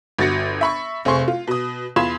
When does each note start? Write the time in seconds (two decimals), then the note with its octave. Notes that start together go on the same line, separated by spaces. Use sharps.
0.18 G1 F#4 A6 A#6 C#7
0.61 E5 B5 C#6
1.05 F1 C4 G#4 C6 C#6
1.28 F4
1.47 B2 D#6
1.96 E2 F4 B5 C6 G#6 E7